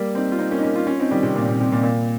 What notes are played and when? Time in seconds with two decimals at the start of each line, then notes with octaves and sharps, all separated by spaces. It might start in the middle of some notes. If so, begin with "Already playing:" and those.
Already playing: G3 A#3
0.15 C4 D#4
0.32 F4
0.39 C4 D#4
0.51 A#3 C#4
0.58 D#4
0.63 A#3 C#4
0.75 C#4 F4
0.87 C#4 F4
1.00 C4 D#4
1.11 D#3 G3
1.23 C3
1.36 A#2
1.48 A#2
1.60 C3
1.72 A#2
1.83 A#2